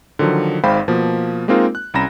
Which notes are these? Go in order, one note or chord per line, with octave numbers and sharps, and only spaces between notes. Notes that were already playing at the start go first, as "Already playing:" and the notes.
D3 D#3 F3 F#3
G#1 G#2 C5 F5 G5 B5
B2 F3 A#3
G#3 A#3 C4 D#4 F4 A#4
F#6
C2 C#4 A#5 B5 A#6 E7